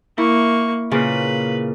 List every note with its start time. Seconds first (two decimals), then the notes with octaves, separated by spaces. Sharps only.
0.18 A#3 E4 C#6
0.91 A#2 C#3 A#3 B4